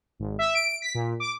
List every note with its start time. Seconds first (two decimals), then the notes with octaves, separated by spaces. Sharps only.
0.19 G#1
0.39 E5
0.55 D7
0.82 B6
0.95 A#2
1.20 D6